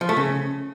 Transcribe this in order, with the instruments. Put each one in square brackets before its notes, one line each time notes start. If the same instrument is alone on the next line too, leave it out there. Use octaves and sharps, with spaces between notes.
[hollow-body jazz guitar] F3
A3
C#3